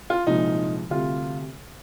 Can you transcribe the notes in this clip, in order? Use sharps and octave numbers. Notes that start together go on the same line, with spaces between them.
F4
C2 A#2 F3 G#3 D#4
D2 C3 G3 F4